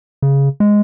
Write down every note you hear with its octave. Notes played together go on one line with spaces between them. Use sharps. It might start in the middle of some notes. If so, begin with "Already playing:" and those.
C#3
G#3